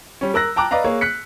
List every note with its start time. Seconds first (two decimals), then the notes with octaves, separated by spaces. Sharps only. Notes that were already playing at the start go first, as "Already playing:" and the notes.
0.21 G3 C#4
0.34 A#4 E6 F#6 A#6
0.56 G5 A5 A#5 D6 F#6
0.71 B4 D5 D#5 F5 A#5
0.84 A#3 G#4 C#5
1.01 F#6 B6 C#7